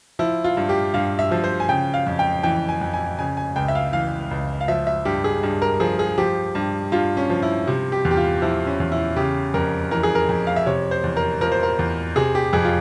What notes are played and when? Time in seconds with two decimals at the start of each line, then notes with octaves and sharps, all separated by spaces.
0.19 F3 E4
0.44 F4
0.57 G2
0.69 G4
0.94 G2 F5
1.19 E5
1.31 F3
1.44 C5
1.60 G#5
1.69 C#3 G5
1.94 F5
2.07 F2
2.19 G5
2.43 E3 G5
2.69 G#5
2.81 F2
2.94 G#5
3.19 C#3 G#5
3.37 G#5
3.56 C#2 G5
3.68 E5
3.75 F5
3.93 E3 F5
4.31 C#2
4.61 F5
4.68 F3 E5
4.87 E5
5.05 G2 G4
5.24 G#4
5.43 G2
5.62 A#4
5.80 F3 G#4
5.99 G#4
6.18 F3 G4
6.55 G2
6.92 G2 F4
7.17 C#4
7.30 F3
7.42 E4
7.67 C3
7.92 G4
8.05 E2
8.11 G4
8.17 F4
8.42 F3 E4
8.67 C#4
8.80 E2
8.92 E4
9.16 C#3 G4
9.54 F2 A#4
9.91 E3 A#4
10.03 G#4
10.15 A#4
10.29 F2
10.47 F5
10.56 E5
10.66 C3 C#5
10.91 C5
11.04 E2
11.17 A#4
11.41 F3 A#4
11.52 C5
11.63 A#4
11.79 E2
12.16 C3 G#4
12.35 G4
12.53 F2 G#4
12.65 F4